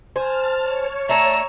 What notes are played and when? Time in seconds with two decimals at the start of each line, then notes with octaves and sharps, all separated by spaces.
0.16 C5 G#5 A5 F6
0.60 C#5
1.09 A3 D4 A5 A#5 E6